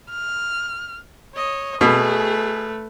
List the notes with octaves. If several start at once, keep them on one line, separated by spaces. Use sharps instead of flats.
F6
C#5 D#5
B2 A3 G#4 B4